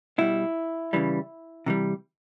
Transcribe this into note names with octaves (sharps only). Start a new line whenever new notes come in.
B2 G3 E4
C#3 E3 G3
C3 E3 G3